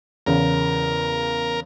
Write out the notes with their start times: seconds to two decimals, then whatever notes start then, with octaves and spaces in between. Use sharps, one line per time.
0.26 E2 C#3 A#4